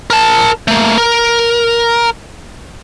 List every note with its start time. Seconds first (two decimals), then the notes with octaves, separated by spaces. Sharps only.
0.10 A#4 A5
0.68 A3 A#3
0.98 A#4